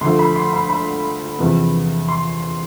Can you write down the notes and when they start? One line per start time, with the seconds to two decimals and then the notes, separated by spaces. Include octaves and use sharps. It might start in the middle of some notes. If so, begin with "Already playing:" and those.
0.01 D2 D3 F3 A3 C6
0.19 B5
0.36 C6
0.53 B5
0.70 B5
1.39 E2 C3 F3 B3
2.08 C6